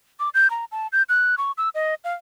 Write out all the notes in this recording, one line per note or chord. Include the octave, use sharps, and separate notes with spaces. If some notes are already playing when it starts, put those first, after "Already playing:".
D6
G6
A#5
A5
G6
F#6
C#6
E6
D#5
F5